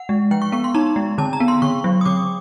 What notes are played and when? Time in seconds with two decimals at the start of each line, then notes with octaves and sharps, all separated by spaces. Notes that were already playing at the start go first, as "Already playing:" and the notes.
Already playing: F#5
0.09 G#3
0.31 F3 G5
0.42 C#6
0.52 B3 C#6
0.64 C6
0.75 D#4 A#5
0.96 G#3
1.18 D3 A5
1.33 A#5
1.40 B3
1.48 C6
1.62 D3 C#6
1.84 F#3
2.01 D#6
2.05 D3 D6